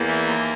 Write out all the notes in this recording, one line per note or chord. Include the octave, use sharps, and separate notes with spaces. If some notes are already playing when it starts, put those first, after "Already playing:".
Already playing: E2 A#3
E3
D#2